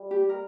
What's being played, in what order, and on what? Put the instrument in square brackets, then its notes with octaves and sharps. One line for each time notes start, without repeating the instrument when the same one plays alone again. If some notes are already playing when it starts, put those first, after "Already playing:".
Already playing: [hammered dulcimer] G3
[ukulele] G4
A#4